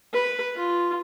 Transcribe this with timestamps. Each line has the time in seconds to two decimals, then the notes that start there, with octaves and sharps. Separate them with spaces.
0.13 B4
0.56 F4